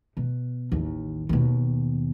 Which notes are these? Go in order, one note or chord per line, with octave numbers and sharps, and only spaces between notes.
B2
A1 D#2
D#2 B2